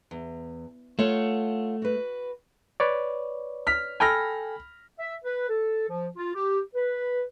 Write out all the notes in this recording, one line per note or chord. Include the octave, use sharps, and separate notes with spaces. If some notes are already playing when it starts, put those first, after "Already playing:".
E2
A3 F4 C#5 F#5
F#4 B4
B4 C#5 D5
F6 B6
A4 G5 G#5 B5 F6 A#6
E5
B4
A4
F3
F4
G4
B4